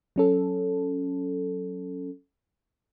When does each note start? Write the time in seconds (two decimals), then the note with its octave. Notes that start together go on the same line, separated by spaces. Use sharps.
0.16 F#3 C#4 A4